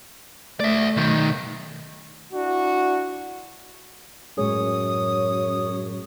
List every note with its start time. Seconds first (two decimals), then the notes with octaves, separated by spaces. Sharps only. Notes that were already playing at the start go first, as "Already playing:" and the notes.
0.60 A3 D5 E5
0.97 B1 D#3
2.33 D4 E4 F#4
4.38 F#2 A2 G#3 G#4 C#5 D#6